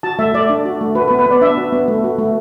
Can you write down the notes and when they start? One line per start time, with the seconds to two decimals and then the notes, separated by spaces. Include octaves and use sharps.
0.03 F#4 A5
0.19 A3 E5
0.34 A3 D5
0.50 D4
0.65 F#4
0.81 A3
0.95 F#4 B4
1.08 B4
1.11 B3
1.19 B4
1.26 B3 D5
1.41 D4 E5
1.57 F#4
1.72 B3
1.88 A3
2.04 F#4
2.18 A3